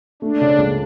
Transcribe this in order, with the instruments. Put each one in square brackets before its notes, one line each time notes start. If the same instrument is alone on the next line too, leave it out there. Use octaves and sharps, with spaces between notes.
[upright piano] A3 [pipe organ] D4
[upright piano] C#3
C#2